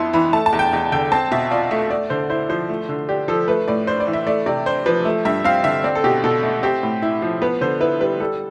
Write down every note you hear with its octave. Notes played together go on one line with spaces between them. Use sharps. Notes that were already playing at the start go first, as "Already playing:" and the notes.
Already playing: F2 B3 E4 A5 C6
E3 B5
A3 A5
A5
E2
G5
E2
D3 G5
C4 A5
B2 E5
F4 D5
A3 E5
A3 D5
D3 C5
E4 C5
F3 C5
A3
D3
D4 G4
F3 A4
A3 B4
A2 D5
D4 C5
D5
E3
E5
A3 D5
C3 D5
D4 C5
F3 B4
A3
G2 E5
C4 F5
D3 E5
C4 D5
A4
B2 G4
B2 A4
A3
C4 G4
A2
E4
F3
B3 B4
D3 C5
E4 B4
G3 B4
G3 A4